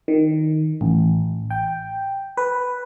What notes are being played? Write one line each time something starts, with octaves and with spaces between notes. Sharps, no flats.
D#3
A1
G5
B4